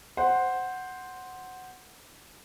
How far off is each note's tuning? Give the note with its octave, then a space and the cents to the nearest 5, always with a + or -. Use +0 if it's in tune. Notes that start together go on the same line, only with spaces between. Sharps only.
C5 +0 F#5 +0